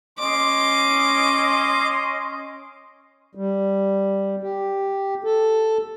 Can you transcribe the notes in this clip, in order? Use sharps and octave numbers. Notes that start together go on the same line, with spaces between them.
C#4 D#5 C6 D6
G3
G4
A4